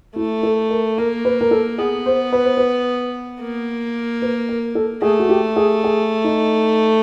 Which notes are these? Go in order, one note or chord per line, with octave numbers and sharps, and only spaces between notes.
A3 E4
A4
A#4
A#3 A#4
B4
A#4
A4
B3 G#4
C5
B4
C5
B4
A#3
B4
A#4
A4
A3 G#4
F#4
G4
G#4
G#4
D#4